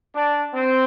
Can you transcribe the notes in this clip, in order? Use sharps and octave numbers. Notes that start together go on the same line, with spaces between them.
D4
C4